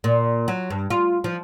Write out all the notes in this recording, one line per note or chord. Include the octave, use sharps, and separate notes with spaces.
A#2
F#3
G2
F4
F3